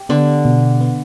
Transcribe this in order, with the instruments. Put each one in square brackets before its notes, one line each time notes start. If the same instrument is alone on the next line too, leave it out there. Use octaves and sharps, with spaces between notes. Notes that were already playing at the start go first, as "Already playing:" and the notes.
Already playing: [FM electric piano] G4
[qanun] D3 [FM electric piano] B3
[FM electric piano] B2
B3